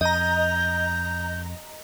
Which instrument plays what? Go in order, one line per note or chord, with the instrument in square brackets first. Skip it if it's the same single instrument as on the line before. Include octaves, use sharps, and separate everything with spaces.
[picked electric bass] F2 [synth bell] D#5 A#5 [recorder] G6